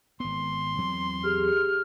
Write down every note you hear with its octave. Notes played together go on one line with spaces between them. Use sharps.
G#1 B3 C6
E2 F#3 C4
G4 G#4 F6